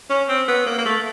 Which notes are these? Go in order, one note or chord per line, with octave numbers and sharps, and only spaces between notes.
C#4
C4
B3
A#3
A#3
A3